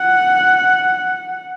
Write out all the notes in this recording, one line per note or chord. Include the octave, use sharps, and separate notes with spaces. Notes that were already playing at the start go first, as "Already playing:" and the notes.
Already playing: F#5